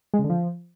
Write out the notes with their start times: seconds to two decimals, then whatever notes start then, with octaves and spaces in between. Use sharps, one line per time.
0.14 G#3
0.19 C#3
0.24 D3
0.30 F3